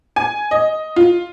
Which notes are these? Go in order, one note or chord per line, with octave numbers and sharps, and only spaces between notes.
G#5
D#5
F4